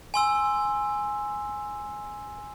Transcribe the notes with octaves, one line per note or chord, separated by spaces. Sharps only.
G#5 C6 E6